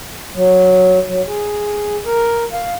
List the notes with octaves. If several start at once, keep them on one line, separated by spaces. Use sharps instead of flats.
F#3
F#3
G#4
A#4
F5